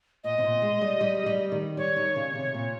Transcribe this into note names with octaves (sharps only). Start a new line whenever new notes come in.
A#2 D#5
C3
A#2
G#3
G3
G3
G3
D#3
G3 C#5
D#3
C#3
C3
A#2